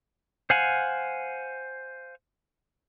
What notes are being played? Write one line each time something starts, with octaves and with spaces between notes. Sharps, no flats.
C5 F5 F#5 G#5